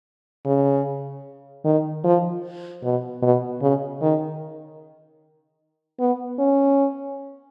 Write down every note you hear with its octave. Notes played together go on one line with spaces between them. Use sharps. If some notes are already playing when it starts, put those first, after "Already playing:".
C#3
D#3
F3
B2
B2
C#3
D#3
B3
C#4